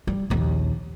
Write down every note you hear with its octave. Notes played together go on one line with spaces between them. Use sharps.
G3
A#1 D#2